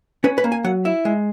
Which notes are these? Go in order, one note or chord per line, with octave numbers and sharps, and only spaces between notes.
C#4 B4
B4
A#3
G#5
F#3 F#5
E4 E5
G#3